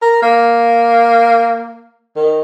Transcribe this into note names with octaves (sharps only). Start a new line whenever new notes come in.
A#4
A#3
D#3